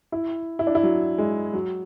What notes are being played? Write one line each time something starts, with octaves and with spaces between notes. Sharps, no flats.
E4
E4
D4
E4
F#3
G#3
F#3